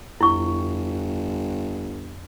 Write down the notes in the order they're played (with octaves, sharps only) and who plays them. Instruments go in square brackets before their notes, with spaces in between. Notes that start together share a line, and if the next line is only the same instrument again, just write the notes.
[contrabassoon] G1 [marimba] F2 [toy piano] E4 C#6